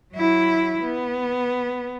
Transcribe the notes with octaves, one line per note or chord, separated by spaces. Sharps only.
F#3 E4
B3